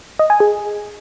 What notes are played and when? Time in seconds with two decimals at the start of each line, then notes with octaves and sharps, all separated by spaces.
0.19 D#5
0.30 G#5
0.40 G#4